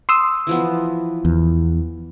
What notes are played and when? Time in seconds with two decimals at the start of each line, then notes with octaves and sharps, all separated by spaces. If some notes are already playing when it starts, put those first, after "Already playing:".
0.09 C6 D#6 E6
0.47 E3 F3 B3
1.25 E2